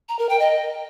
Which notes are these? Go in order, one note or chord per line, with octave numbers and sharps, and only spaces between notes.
A#5
A#4
G5
D#5